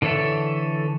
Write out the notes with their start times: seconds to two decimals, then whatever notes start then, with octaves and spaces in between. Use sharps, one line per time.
0.02 D3 E3 A4 C#5 E5